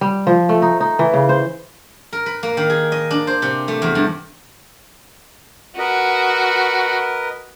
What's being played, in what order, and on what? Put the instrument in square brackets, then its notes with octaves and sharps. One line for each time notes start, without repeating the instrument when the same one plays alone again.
[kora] G3
F3
A3
D#4
D#4
E3
C#3
C5
[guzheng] A#4
B4
A#3
D#3
G#4
D#5
D4
C5
C3
A3
E2
G2
[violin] F#4 [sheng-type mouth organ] A#4 B4 D#5